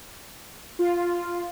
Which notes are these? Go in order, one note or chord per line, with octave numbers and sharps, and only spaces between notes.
F4